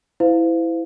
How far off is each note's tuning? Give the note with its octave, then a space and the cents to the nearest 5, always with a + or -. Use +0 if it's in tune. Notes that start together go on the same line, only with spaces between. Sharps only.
E4 +0 C5 -40 F5 +0